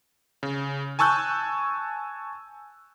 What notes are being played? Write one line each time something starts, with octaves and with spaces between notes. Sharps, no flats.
C#3
G#5 A5 C#6 E6 F#6 G6